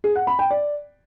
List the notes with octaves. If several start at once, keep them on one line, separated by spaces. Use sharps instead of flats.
G#4
F#5
B5
G5
D5